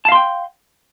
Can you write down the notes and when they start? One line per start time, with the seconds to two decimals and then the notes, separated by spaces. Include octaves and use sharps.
0.05 A5
0.08 F5
0.12 C6
0.15 G5